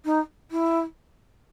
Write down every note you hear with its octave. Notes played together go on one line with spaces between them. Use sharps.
D#4
E4